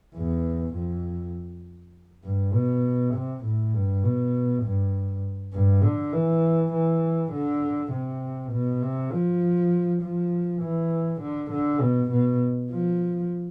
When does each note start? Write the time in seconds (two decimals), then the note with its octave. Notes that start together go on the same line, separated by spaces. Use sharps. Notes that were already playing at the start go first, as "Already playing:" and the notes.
0.16 E2
0.75 F2
2.24 G2
2.54 B2
3.14 C3
3.44 A2
3.74 G2
4.03 B2
4.63 G2
5.53 G2
5.83 D3
6.13 E3
6.73 E3
7.32 D3
7.92 C3
8.52 B2
8.82 C3
9.12 F3
10.02 F3
10.62 E3
11.21 D3
11.51 D3
11.81 B2
12.11 B2
12.71 F3